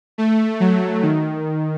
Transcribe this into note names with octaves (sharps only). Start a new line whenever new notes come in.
A3
F#3
D#3